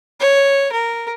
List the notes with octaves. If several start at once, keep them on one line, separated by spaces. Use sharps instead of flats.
C#5
A#4